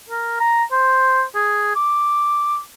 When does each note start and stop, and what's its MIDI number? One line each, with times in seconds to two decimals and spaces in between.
0.10 0.38 70
0.39 0.64 82
0.71 1.22 72
1.35 1.75 68
1.76 2.59 86